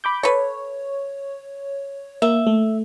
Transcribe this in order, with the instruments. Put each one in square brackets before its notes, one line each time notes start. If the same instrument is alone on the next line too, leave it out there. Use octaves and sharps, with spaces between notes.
[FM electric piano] B5 D6 G6
[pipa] A4 B4 [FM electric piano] C#5
[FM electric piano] A#3 [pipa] E5
[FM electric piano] A3